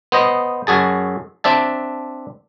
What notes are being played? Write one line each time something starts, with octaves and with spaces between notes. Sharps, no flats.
B3 C5 D#5
F#2 F#4 G#4 A5
C4 D4 E5 A5